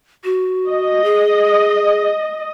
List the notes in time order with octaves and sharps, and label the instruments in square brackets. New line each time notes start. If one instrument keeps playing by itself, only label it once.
[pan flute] F#4
[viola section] D#5
[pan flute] G#4